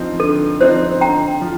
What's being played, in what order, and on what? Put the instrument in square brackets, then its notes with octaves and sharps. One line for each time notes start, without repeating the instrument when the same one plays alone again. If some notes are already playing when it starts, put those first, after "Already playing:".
Already playing: [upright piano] D3 F3 C4 D#4
[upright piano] D3 [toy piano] A4
[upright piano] F3 C4 D#4 [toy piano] C5
[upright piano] D3 [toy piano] G5 A#5
[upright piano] F3